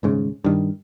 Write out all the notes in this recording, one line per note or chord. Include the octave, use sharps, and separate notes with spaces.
D#1 G#2 C#3
G2 D#3